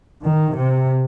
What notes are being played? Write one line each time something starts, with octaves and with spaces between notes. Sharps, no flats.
D#3
C3